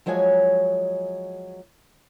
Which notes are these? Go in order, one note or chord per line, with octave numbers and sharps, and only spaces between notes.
F3 F#3 G#3 C#5 G#5